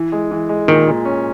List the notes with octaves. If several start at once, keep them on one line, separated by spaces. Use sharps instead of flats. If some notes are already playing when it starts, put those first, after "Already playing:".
Already playing: E3
G#3
E3
G#3
A#2 D#3
A#2
C#4